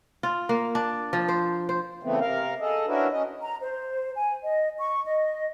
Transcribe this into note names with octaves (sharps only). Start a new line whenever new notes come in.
F4
A#3
D4
F3
C5
C5
C#3 E3 A3 B3 C4
C3 A#4 F5
G#4 A4 D#5
C#4 D4 E4 F#4 A#4 B4
C#4 D#5
A#5
C5
G#5
D#5
C#6
D#5